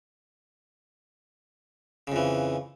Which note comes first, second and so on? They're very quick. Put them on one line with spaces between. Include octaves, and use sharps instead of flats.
C#3 F2 E3